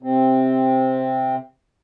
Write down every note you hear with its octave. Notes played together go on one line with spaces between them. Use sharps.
C3 C4